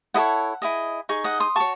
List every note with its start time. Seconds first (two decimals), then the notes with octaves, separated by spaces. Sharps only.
0.14 E4 A4 C#5 D#5 F#5
0.62 E4 G#4 D#5
1.09 D#4 G#4 C#6
1.24 D#5 F#5
1.40 C6 D#6
1.56 F#4 C#5 A5 C#6